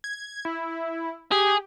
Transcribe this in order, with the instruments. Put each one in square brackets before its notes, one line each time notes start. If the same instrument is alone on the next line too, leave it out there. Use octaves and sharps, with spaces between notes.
[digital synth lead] G#6
E4
[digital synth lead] G4 [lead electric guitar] G#4